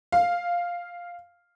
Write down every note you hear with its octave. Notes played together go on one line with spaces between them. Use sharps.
F5